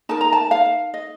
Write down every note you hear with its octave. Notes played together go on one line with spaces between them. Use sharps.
D#4 A#4 A5
A#5
A5
F5
D#5